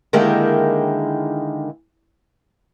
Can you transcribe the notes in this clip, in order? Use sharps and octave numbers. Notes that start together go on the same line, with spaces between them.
D3 D#3 G#3 A#3 E4 G4